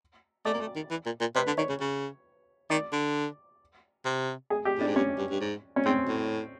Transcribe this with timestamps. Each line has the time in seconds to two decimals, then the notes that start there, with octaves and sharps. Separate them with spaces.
0.45 A3 D5
0.54 A#3
0.61 A3
0.76 D#3
0.91 E3
1.06 A#2
1.21 A#2
1.36 C3 B4
1.47 D3
1.58 D#3 C#5
1.69 C#3
1.81 C#3
2.70 D#3 D5
2.93 D3
4.06 C3
4.50 G#4
4.65 G4
4.78 A2 D4
4.87 G#2
4.95 G2 C#4
5.18 G2
5.30 G2
5.41 G#2
5.76 C#4
5.86 G#2 C4
6.08 A2